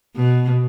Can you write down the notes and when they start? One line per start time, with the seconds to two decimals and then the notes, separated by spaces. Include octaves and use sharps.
0.16 B2